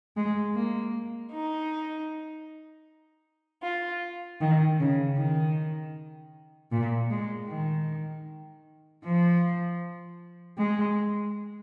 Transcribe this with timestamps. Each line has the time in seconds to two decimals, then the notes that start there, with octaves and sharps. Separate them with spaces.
0.17 G#3
0.55 A#3
1.33 D#4
3.64 F4
4.41 D#3
4.79 C#3
5.18 D#3
6.72 A#2
7.10 G#3
7.49 D#3
9.04 F3
10.58 G#3